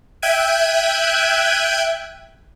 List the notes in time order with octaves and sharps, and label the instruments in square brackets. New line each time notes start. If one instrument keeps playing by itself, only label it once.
[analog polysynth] E5 G5 F#6 G#6 D#7